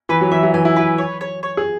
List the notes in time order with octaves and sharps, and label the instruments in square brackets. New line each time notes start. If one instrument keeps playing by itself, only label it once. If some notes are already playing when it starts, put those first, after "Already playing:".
[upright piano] E3 [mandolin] B4
[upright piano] F#3
[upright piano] E3 [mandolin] E5
[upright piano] F#3
[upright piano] E3 [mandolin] G#5
[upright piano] E4
[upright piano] E4 [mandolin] B4
[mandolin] C#5
C#5
C#5
[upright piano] G#4